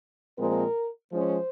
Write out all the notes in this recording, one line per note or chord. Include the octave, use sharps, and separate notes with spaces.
A#2 F3 G#3 C4 A#4
F3 G#3 C#4 C5